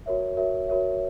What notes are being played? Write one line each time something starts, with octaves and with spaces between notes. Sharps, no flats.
F#4 A#4 C#5 E5
F#4 A#4 C#5 E5
F#4 A#4 C#5 E5